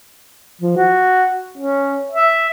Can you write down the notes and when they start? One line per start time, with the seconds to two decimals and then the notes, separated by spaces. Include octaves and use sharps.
0.61 F3
0.76 F#4
1.58 C#4
2.11 E5